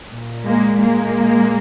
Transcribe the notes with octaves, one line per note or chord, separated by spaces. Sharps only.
A#2
G#3 A#3
G#3 A#3